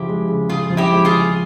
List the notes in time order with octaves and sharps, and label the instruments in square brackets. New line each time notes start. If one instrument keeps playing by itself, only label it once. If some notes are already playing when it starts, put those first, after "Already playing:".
Already playing: [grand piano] C#3 F3 [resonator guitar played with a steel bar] E4 G4
[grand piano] G#3
C#3
[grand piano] C#3 [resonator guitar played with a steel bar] F4 G#4
[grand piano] F3
[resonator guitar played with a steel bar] E4 G4
[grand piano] G#3
[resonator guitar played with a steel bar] F4 G#4
[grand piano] C#3